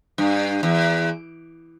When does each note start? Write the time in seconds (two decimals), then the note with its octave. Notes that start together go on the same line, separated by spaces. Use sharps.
0.18 G2
0.63 E2